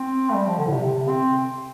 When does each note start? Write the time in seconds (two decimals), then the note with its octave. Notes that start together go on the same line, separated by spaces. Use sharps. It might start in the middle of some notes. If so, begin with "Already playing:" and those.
Already playing: C4
0.29 A3
0.35 G3
0.47 F3
0.58 D3
0.67 A2
0.72 C3
0.84 C3
1.08 C4